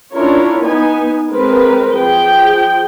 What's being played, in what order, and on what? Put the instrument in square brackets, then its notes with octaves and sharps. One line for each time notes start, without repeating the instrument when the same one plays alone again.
[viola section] C#4 D4 E4 F4 A#4 C#5
B3 D#4 B4 G#5
G#3 C4 A#4 B4
F3 G#4 G5